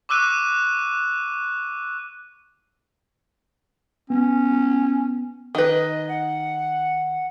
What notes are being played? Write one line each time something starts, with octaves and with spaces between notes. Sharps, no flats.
C#6 D6 E6 F#6 D#7
B3 C#4
D#3 B4 D#5
F#5